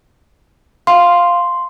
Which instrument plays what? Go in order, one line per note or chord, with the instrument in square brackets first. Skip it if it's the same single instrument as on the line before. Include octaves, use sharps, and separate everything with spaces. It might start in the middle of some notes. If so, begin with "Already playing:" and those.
[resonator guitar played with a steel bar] F5 [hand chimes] C6